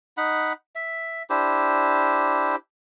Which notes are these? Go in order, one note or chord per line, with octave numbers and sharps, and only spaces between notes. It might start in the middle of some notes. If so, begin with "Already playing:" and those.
D#4 F#5 B5
E5
D4 E4 G4 C5